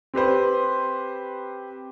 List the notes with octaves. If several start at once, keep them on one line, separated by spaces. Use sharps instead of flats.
C4 G4 B4 C5